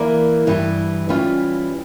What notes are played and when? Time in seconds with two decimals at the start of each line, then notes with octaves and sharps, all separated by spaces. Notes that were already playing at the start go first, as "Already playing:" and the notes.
Already playing: E3 A#3 E4 A#4 D5
0.47 G2 E3 G3
1.09 E3 G3 C#4 F4